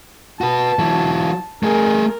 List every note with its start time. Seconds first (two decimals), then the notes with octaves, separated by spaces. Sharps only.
0.41 F#4 B4 A5
0.79 E3 F#3
1.63 A3 G#4 A#4